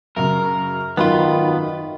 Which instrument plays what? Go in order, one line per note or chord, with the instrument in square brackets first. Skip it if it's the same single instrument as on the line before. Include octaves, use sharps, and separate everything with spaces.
[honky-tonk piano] F#2 C#3 [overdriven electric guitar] A#4
[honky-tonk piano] G#1 F#2 B5 [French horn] D#3 [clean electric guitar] B3 F4